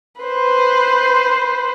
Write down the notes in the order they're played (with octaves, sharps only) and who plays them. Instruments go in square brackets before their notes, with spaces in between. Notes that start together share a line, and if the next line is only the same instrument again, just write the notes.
[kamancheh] B4 C5